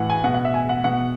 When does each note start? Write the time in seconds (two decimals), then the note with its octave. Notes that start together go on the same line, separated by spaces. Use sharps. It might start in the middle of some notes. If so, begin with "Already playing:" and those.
Already playing: A2 E3 F#5
0.10 G#5
0.24 B2 F#5
0.34 F#5
0.45 E5
0.54 G#5
0.69 F#5
0.84 B2 F#5